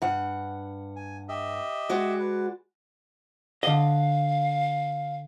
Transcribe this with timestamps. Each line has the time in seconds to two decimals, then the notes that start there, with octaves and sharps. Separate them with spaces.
0.02 G2 F#5
0.96 G#5
1.29 G4 D#5 E5
1.89 G#3 F#4 D5
2.19 B4
3.63 D3 D#5 F5